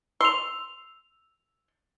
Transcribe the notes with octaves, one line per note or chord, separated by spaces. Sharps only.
C6 E6 F7